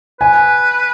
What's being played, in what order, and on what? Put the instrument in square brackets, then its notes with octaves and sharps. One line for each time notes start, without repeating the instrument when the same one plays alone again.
[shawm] B4 [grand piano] G#5